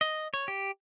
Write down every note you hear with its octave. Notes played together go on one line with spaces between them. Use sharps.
D#5
C#5
G4